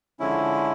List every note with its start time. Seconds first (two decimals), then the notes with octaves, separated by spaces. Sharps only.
0.20 D3 F3 G#3 C#4 E4